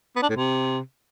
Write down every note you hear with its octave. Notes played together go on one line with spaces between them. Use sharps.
B3
D4
A2
C3